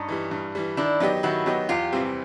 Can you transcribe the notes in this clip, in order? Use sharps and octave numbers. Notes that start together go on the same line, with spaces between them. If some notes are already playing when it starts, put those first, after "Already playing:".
Already playing: G2 C#4 D#4
E3 G3
G2
E3 G3
D#3 D4 E4
F#3 B3 D#4 G4
D#3 E4 F#4
F#3 B3 D#4 G4
E2 F4 G4
C3 E3 G3 C4